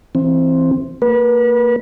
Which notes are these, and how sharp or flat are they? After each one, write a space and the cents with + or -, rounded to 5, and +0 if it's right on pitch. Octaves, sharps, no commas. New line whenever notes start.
E3 +0 C4 +5
A#3 -30 B4 -35